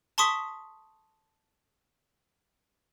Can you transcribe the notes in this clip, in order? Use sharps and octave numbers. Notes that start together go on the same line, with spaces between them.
A5 C6 C#6 D#6 B6